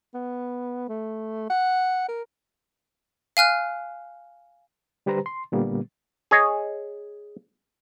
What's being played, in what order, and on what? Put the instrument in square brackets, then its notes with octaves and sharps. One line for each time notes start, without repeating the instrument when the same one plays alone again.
[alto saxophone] B3
A3
F#5
A#4
[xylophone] F5 G#5 F6 F#6
[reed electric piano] D3 G3 G4 B4 C5 A#5
C6
A#2 D3 G3 A#3 B3
[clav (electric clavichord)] G#4 C#5 D#5